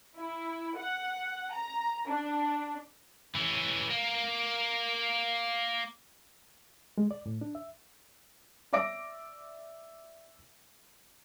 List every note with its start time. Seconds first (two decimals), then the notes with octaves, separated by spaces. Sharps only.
0.16 E4
0.77 F#5
1.53 A#5
2.07 D4
3.35 E3 C#4
3.90 A#3
6.98 G#3
7.11 D5
7.26 A2
7.41 D4
7.55 E5
8.73 D5 E5 D6 A#6 D7